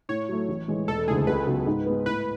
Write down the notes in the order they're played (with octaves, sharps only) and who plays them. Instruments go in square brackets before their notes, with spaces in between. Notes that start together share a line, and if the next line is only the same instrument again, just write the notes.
[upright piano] A2 [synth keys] C#5
[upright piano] F#3 A3
A1
A2 E3 G#3
[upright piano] E1 [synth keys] A4
[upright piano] D2 C#3 E3 G#3 [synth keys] G#4
[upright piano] C#2 [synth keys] B4
[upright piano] C#3 F#3 B3 F#4
G#2
G#3 B3
[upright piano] A2 [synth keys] B4